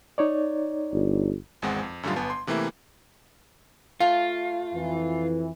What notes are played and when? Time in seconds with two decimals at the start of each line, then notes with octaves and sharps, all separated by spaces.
0.18 D#4 C#5 D5
0.93 G1
1.62 G#1 E2 G#3 C4 F#5
1.83 F2
2.03 F#2 A2 D3 F#3 G3 F4
2.16 G1 B3 G#5 A5
2.30 C6
2.47 C3 E3 A3 A#3 E4
4.00 A3 F4 F5
4.74 F2 E3